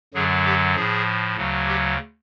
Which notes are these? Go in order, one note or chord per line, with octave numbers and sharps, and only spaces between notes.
F#2 D3 F#3 G#4
G4
A2 F3 G#4
D2 C#3 F#3
G4